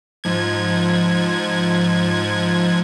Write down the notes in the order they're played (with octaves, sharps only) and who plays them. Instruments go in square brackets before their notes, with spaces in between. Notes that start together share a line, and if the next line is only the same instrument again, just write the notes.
[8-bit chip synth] G#2 F3 G#6